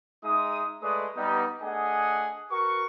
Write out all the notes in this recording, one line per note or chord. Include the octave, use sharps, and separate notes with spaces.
G#3 D#4 E5 D#6
G#3 A3 B4 D5 D#6
G3 B3 D#4
A3 D4 G#4 D#5 F#5 G#5
F#4 A#4 B4 C#6